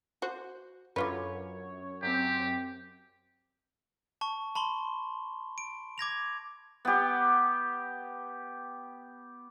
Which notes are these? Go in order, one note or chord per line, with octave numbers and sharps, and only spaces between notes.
F#4 C5
F#2 D3 F4 B4 C#5
F#2 C4 G4
A5 C#6
A5 B5 C6 G7
D7
D6 G#6 A#6 F7
B3 G4